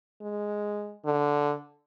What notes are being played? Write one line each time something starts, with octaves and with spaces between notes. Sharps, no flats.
G#3
D3